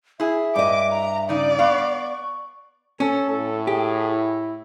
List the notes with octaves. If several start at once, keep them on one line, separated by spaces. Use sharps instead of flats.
E4 G#4 E5
G2 D#5 D6
A#5
C#3 D#4 D5
B3 F5 C#6
C#4 A4
A2 A4
G4 G#4
E4